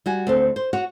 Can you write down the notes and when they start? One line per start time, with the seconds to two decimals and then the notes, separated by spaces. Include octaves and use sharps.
0.06 G3 F#4 G#5
0.27 D2 C4 A4
0.56 C5
0.73 F#4 C#5 F#5